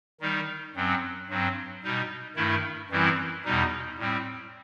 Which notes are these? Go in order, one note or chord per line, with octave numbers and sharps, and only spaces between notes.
D#3 G3 D#4
F#2 F#3 C4
G2 F#3 C4
B2 G3 D#4
G2 D#3 A3 E4
F#2 E3 G3 C4 E4
E2 B2 G3 D#4
A2 G3 C4